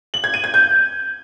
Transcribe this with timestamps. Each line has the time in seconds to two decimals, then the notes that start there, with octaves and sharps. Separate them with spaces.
0.14 F#7
0.24 G#6
0.34 D#7
0.44 G#6
0.54 G6